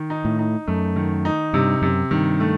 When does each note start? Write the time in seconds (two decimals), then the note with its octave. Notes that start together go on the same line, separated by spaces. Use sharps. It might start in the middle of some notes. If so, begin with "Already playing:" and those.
Already playing: D#3
0.10 D#4
0.25 A2
0.39 D#4
0.67 F#2 A3
0.96 D#3
1.25 D#4
1.53 G2 C3
1.82 F#2 C3
2.11 G2 D#3
2.40 A3